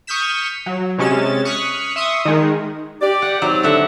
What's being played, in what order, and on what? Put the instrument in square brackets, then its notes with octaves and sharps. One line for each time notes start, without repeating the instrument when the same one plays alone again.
[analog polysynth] C#6 D#6 F6 G6 B6 E7
F#3
C3 G#3 C#4 A6 E7
C#6 D#6 F6 F#6 B6
E5 C6 C#6 D#6
D#3 G#3
[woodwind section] G4 [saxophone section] D5
[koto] F#5
[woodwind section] C3 D#4 E6 [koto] F#3 [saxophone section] D5
[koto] D3 E5 F#5